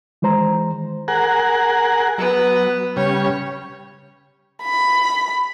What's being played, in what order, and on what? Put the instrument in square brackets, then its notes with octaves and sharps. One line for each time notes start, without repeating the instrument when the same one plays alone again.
[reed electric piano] D#3 E3 G#3 C5 A#5
[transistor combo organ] G#4 A#4 F#5
[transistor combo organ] F#3 [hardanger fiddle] B3 B4
[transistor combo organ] C#3 G3 [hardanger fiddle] C#5
[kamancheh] B5